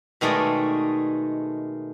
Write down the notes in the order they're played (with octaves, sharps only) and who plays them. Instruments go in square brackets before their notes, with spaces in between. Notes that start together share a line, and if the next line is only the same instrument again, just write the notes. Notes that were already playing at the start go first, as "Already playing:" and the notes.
[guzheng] B2 D#3 G#3 A3 D5 D#5